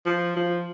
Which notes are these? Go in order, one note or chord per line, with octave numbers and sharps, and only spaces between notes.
F3
F3